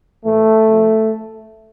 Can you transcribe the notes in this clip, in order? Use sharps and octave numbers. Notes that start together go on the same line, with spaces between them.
A2 E3 A3
C3 F3